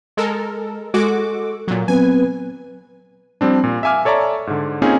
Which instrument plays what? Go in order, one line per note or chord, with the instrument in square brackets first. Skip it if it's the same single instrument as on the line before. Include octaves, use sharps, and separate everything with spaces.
[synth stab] G#3 A4 A#4
[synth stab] G#3 F#4 D6 [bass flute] A4
[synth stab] A#2 F#3
[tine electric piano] F#3 B3 C4 [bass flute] B4 [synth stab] G#5
[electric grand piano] F3 G3 C4 D4
A#2
E5 F5 G#5 D6 F6
A4 C#5 D5 E5 A#5
G#2 D3
A#3 C4 C#4 D#4 F4 G#4